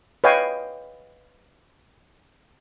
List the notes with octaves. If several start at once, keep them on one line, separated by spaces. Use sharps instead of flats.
B4 C#5 D#5 F5 G5 G#5